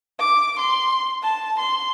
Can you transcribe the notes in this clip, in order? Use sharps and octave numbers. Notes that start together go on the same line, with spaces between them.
D6
C6
A5
C6